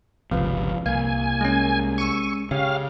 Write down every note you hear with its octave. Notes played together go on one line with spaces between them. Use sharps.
G1 C#2 C3 F3 B4 F5
C2 A#3 F5 G#5
G#3 C#4
C#6 E6 C#7 D#7
C#3 G4 C#5 F5